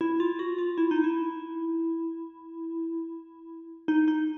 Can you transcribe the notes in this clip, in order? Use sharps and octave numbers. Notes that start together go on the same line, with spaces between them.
E4
F4
F#4
F4
E4
D#4
E4
D#4
D#4